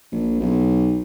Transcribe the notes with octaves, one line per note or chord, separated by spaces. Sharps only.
A#1
B1